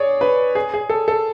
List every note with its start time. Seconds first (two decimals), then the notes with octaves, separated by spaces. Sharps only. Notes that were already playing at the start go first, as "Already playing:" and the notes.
Already playing: G#4 C#5 D5
0.21 B4
0.55 G#4
0.74 G#4
0.89 A4
1.08 A4